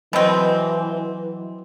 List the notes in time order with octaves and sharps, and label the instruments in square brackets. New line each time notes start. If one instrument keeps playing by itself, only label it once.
[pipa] B2 C4 [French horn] E3 [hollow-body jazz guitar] F#3 B4 D#5